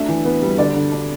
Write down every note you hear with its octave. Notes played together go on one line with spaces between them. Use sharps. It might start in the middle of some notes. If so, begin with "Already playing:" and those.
Already playing: A3 D4 E5
E3
B3
G3
D3 D5
D3
D4